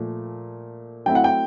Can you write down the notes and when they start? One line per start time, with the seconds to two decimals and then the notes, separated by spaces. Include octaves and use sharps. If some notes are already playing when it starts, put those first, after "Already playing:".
Already playing: A#2 F3 A3
1.06 F#3 A3 C4 E4 G5
1.15 F#5
1.24 G5